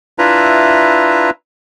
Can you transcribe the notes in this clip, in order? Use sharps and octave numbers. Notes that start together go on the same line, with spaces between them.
D4 E4 F4 B4 E5 A#5